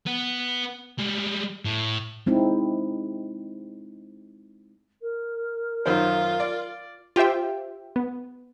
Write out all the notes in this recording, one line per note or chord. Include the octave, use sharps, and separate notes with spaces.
B3
G3 G#3
A2
G#3 C4 D#4 E4
A#4
F#2 D#3 F4 C5
D5
F4 G4 C5 E5 G5
B3